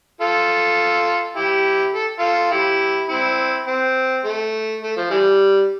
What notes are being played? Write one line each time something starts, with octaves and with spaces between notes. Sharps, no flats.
F4 A4
E4 G4
A4
F4 A4
E4 G4
C4 E4
C4
A3
A3
F3
E3 G3